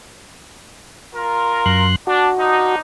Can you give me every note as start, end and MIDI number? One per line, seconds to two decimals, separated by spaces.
1.14 1.88 65
1.14 1.88 70
1.66 1.96 42
1.66 1.96 84
1.66 1.96 90
2.07 2.28 62
2.07 2.75 66
2.37 2.78 53
2.37 2.78 62
2.37 2.78 63